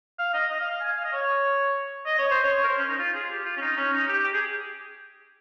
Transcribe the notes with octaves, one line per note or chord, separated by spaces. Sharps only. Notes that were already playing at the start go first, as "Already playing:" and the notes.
F5
D#5
D#5
F5
F5
G#5
F5
D#5
C#5
D#5
C#5
C5
C#5
A#4
C5
C#4
D#4
F4
G#4
F4
G4
F4
C#4
D#4
C#4
D#4
G4
G4
G#4